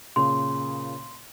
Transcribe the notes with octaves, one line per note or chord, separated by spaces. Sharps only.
A#2 C#3 C6